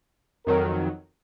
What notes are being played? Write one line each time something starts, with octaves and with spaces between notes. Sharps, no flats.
F2 D#3 F#3 A#4